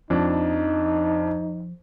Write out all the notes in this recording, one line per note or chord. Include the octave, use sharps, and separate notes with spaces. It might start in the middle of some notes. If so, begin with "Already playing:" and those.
F2 F3 D4 D#4